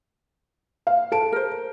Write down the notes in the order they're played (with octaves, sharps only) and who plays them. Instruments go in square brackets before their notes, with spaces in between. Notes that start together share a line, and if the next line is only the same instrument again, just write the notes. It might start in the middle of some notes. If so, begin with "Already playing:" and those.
[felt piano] F5
[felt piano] A4 D7 [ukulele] A5
[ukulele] A#4 C5